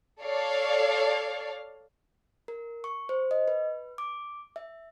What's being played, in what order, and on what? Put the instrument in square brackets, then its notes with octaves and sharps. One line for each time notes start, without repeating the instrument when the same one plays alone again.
[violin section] A4 C#5 D5 F5
[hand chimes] A#4
C#6
C5
D#5
B4
D6
E5